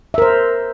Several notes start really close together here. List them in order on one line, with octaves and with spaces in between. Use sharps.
E5 A#4 C5